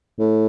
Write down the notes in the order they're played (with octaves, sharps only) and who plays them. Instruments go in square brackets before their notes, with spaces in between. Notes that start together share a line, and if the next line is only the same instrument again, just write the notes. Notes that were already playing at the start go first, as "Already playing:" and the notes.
[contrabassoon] A2